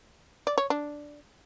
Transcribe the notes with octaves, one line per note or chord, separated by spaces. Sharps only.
D5
C#5
D4